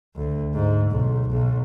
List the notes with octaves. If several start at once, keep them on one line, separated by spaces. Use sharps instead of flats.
D2
G#2
B1
B1